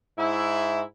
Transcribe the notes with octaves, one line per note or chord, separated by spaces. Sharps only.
G#2 E4